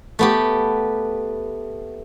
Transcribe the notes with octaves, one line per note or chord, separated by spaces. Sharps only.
A3 B3 G4